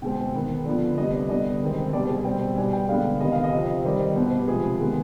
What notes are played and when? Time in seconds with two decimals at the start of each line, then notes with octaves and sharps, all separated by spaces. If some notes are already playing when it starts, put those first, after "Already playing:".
0.02 B2 G#3 C4 G5
0.34 D#3 B3
0.66 D3 F3 B3
0.98 C3 G3 B3 D#5
1.13 D5
1.29 D3 G3 B3 D#5
1.61 C3 D#3 G#3 C4
1.93 B2 G3 C4 D5
2.09 G#4
2.24 B2 G3 C4 G5
2.56 B2 G3 B3 G#5
2.73 G5
2.89 D3 G#3 B3 F5
3.20 C3 D#3 B3 D#5
3.32 F5
3.44 D#5
3.53 C3 F3 C4
3.84 D#3 G3 C4 C5
4.00 D#5
4.15 B2 B3 C5
4.27 B4
4.37 G4
4.47 C3 F3 G#3 C4 G#4
4.79 D#3 G#3 B3